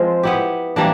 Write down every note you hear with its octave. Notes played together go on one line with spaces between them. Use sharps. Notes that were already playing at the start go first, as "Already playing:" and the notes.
Already playing: F3 G#3 C4
B3 E4 G4
E3 G3 A#3 D4